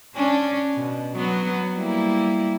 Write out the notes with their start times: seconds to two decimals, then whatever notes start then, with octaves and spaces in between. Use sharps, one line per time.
0.15 C#4 D4
0.75 B2
1.16 F#3 B3
1.74 G3 A#3 E4